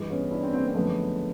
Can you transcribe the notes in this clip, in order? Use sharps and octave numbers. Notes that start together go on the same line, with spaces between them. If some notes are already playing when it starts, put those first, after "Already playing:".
Already playing: G2 E3 G#3
B3 C#4
D4 E4
C4 D4
A#3 C4
C4
F#2 D3 F3 G#3 A3 B3